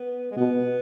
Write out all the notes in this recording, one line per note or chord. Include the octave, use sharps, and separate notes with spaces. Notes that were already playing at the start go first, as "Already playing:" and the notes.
Already playing: B3
G#3
B2 B3